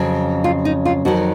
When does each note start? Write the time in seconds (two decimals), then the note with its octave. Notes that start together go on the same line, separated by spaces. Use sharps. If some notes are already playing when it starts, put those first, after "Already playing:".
Already playing: F2 C#3 F#3
0.44 F4
0.65 D#4
0.85 F4
1.05 F2 D#3 F#3 F#4